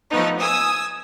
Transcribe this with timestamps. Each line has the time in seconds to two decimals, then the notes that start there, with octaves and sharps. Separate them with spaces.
0.10 F3 A3 B3 D#4
0.39 G#5 D#6 E6